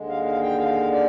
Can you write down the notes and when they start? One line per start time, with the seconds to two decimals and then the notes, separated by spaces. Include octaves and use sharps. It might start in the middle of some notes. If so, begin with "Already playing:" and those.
Already playing: D#2 D3 G#3
0.09 F5
0.25 F5
0.42 G5
0.59 F5
0.92 D5